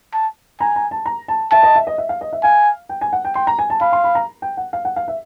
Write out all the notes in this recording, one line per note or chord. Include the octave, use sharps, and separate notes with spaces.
A5
G#5 A#5
A#5
A5
A#5
A5
E5 A5
D#5
E5
D#5
E5
F5
D#5
E5
F5 G#5
G5
G#5
F#5
G5
G5 C6
A#5
G#5
A5
F5 B5
C6
B5
A#5
G5
F#5
F5
F#5
F5
E5